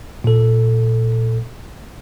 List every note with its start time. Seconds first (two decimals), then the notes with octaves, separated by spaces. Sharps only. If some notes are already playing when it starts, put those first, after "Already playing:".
0.24 A#2 A4